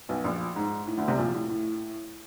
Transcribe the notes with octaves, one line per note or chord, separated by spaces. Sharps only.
B1 B2
A#1 A#2
G#2
A2
D2 D3
C2 C3
A#1 A#2
A2
A2